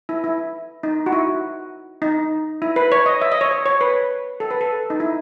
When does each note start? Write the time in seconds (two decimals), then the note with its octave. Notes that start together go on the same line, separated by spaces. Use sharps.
0.09 E4
0.24 E4
0.83 D#4
1.06 F#4
1.12 E4
2.02 D#4
2.62 E4
2.76 B4
2.92 C#5
3.06 D#5
3.22 E5
3.32 D#5
3.41 C#5
3.51 C#5
3.66 C#5
3.81 B4
4.40 A4
4.51 B4
4.61 A4
4.90 D#4
5.00 E4